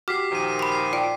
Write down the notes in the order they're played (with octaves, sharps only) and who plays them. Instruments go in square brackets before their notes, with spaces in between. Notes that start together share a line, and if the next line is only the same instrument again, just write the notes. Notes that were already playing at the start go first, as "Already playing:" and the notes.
[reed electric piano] F#4 G4 [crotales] D6 B6 C7 [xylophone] F6
[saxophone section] A#2 D#3 F3 [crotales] D6 D#7
[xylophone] B5 C6
[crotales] C7
[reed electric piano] F4 D5 [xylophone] G5 D7